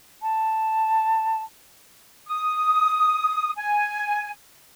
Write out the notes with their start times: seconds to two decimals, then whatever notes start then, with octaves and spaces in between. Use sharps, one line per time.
0.22 A5
2.28 D#6
3.55 G#5